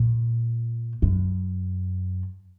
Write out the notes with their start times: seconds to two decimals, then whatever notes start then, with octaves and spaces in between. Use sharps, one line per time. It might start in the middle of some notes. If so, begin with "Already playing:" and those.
Already playing: A#2
1.02 F#2